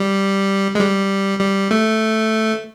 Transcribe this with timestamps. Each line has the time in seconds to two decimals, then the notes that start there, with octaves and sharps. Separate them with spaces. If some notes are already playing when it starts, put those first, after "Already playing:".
Already playing: G3
0.75 G#3
0.80 G3
1.40 G3
1.71 A3